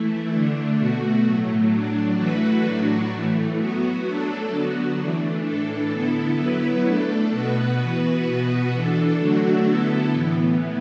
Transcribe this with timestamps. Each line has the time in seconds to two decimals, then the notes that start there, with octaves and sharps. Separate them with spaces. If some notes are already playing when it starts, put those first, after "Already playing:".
Already playing: E3 A3 E4
0.31 D3 A3 D4
0.77 B2 A3 F#4
1.24 A2 F#3 A3
1.71 A2 F#3 D4
2.18 E3 A3 F#4 B4
2.64 A2 F#3 D4 F#4
3.12 A2 E3 A3
3.58 F#3 B3 F#4
4.05 F#3 A3 D4 A4
4.51 D3 F#3 B3 F#4
4.98 E3 A3 D4
5.44 A2 E3 D4 A4
5.91 D3 B3 E4 A4
6.39 F#3 B3 E4 B4
6.85 A3 D4 A4
7.31 B2 B3 F#4 B4
7.79 E3 B3 F#4 B4
8.25 B2 B3 F#4 B4
8.72 E3 D4 A4
9.20 D3 F#3 A3 D4 F#4
9.65 D3 B3 E4 A4
10.12 A2 E3 B3